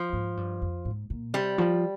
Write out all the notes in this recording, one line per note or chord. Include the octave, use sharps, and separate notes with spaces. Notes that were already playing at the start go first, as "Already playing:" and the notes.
Already playing: F3
G#2
G2
F2
G#2
A#2
C3 G3
F3